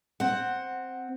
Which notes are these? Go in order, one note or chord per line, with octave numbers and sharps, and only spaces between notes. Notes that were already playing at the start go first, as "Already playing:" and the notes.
C4 F#5